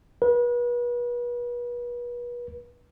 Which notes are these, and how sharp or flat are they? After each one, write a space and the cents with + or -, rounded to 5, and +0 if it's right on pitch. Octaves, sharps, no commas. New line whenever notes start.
B4 -35